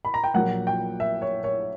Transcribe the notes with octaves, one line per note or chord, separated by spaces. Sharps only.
B5
A#5
G5
A#1 A#2 F#3 A#3 F#5
G5
E5
C#5
C#5